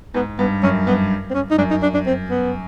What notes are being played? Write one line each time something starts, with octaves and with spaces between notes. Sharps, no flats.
G#2 B3
G2 B3
F#2 C#4
G2 B3
C4
C#4
D#4
F#2 D4
D#4
D4
D4
C4
B3